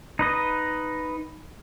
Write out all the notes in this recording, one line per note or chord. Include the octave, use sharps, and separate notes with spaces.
D#4 B4 D#5